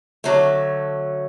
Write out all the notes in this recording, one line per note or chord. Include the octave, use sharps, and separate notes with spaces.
D3 F#3 A3